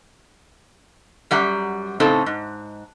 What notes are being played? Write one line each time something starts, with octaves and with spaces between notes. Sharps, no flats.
F#2 G3 F#5 A#5
A2 C#3 C4 D#4 A4
G#2